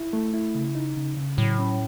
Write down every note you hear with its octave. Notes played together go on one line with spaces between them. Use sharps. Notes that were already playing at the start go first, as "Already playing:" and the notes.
Already playing: E4
A3
E4
C#3
D#4
C#3
C#3
A2 F#3
C#4